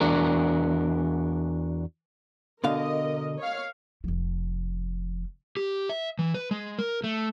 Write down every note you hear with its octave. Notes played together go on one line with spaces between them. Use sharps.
E2 D4 F#4 A#4
B2 D3 A#4 D#5 F5
C#5 F5
F1 F3
G4
E5
E3
B4
G#3
A#4
A3